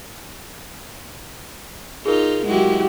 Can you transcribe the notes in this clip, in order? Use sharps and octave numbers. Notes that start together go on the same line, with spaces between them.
D#4 F4 G#4 A#4
F#3 G#3 E4 F#4 G4